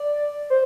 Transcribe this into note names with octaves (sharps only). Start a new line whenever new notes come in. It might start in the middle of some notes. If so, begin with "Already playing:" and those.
Already playing: D5
C5